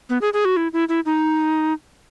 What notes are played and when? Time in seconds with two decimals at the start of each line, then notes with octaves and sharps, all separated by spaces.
0.10 B3
0.22 G#4
0.33 G#4
0.45 F#4
0.57 E4
0.73 E4
0.89 E4
1.06 D#4